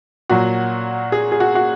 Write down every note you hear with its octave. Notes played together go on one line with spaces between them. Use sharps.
A#2 F#3 F#4
G#4
G#4
F#4
F#4